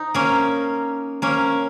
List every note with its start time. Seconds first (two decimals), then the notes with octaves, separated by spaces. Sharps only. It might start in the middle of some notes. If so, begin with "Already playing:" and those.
Already playing: D#4
0.14 A#3 C#4
1.22 A#3 C#4